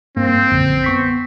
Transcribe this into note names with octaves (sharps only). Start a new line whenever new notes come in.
G2 A#3 C4
A#1 F#2 D3
B3 C#6 B6